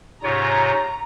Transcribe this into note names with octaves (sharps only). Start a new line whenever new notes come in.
G#2 C3 C#4 F4 G#4 C#5 A#5